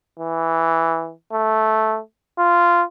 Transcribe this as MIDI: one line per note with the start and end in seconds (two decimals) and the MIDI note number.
0.20 1.12 52
1.33 1.99 57
2.38 2.83 65